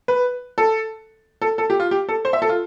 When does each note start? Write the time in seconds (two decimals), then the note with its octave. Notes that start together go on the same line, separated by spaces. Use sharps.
0.08 B4
0.58 A4
1.42 A4
1.58 A4
1.70 G4
1.80 F4
1.91 G4
2.09 A4
2.25 C5
2.33 E5
2.42 A4
2.49 F4